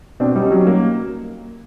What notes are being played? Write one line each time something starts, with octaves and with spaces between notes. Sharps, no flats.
B2 C4 D4
G3 C#4 D#4
F#3
A#3